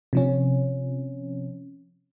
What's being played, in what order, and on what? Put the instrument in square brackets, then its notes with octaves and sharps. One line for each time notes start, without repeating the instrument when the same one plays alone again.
[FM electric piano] C3 F3 C#4